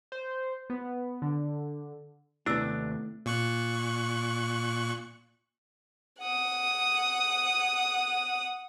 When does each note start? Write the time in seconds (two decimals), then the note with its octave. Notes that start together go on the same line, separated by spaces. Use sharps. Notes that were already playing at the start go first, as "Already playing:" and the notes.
0.12 C5
0.70 B3
1.22 D3
2.46 D#2 C3 A3 B3 D4 E4 E6
3.26 A#2 C#6 F#6
6.20 F#5 D#6